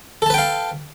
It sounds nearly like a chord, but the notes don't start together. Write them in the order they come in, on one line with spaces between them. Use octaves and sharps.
A4 A5 B4 G5 F5